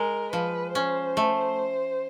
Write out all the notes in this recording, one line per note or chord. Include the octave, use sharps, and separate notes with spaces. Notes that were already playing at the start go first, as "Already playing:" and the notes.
Already playing: G#3 A#4
F3 B4
C#4 C5
A3